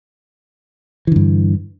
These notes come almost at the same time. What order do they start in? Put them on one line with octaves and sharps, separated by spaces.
E3 D3 G2